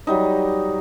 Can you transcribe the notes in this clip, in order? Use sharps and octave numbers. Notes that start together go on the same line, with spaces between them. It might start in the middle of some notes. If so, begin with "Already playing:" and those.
F#3 G3 D#4